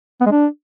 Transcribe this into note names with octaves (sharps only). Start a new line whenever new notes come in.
B3
G#3
D4